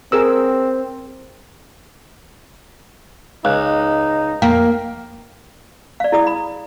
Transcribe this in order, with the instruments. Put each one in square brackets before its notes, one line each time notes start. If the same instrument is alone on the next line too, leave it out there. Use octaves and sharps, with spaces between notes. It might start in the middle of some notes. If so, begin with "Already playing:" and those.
[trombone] C4 [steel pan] G#4 A#4 E6
[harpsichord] C#2 [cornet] D#4 [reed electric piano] F5 F#6
[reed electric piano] F2 G5 [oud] A#3
[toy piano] D5 F5
E4 G#4 D5 D#6
B5